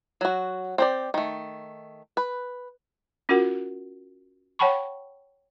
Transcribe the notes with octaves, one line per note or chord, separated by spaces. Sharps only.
F#3 F#4
C4 G4 D5
D#3 A3
B4
C#4 F4 F#4 A#4 F#5
C#5 F#5 G5 A5 B5 C#6